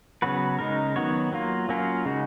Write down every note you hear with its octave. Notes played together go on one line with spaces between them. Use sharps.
C#3 F#3 B3 F#4 B4
C#3 G#3 D#4 A#4
D#3 F#3 B3 F#4 C#5
F#3 A#3 F4
F#3 A#3 C#4 F4
C#3 G#3 D#4 F#4